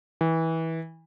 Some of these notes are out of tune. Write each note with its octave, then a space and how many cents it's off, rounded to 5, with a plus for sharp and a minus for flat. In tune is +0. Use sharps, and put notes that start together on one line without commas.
E3 -20